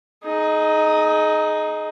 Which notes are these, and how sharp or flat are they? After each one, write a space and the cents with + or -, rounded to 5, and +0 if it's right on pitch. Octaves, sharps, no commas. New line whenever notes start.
D#4 +0 G#4 +30